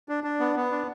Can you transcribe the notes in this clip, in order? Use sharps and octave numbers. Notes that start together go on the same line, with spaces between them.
D4
D4
B3
B3
D4